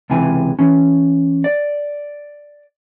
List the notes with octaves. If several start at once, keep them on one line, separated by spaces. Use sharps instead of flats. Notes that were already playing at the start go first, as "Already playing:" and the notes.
C#2 C3 E3 G#5
E3 C#4
D5